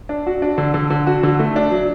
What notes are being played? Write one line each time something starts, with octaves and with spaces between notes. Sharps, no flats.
D4
F#4
D4
D3
D3
D3
F#4
D3
A3
D4
F#3